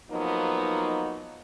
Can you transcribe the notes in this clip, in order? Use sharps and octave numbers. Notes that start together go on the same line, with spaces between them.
F3 F#3 A#3 B3 D#4